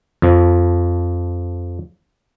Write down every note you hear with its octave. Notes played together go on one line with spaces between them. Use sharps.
F2 F3